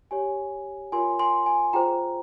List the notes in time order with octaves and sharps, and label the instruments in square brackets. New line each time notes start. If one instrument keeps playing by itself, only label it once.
[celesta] G4 C#5 G#5
F4 A#4 C#5 G#5 C6
G#5 C6
G#5
F4 G#4 C5 G5 A#5